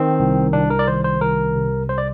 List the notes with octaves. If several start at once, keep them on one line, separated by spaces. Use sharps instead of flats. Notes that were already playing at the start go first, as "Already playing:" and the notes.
Already playing: D#3 C4
C2
C2 D4
A#4
D5
D#3 C5
C5
C2 A#4
C3
C2 C5
D5